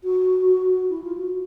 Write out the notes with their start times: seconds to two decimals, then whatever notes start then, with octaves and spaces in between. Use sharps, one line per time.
0.04 F#4
0.90 E4
1.03 F4
1.17 F#4